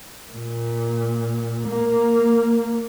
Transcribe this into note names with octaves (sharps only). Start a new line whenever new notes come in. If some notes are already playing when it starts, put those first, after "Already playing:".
A#2
A#3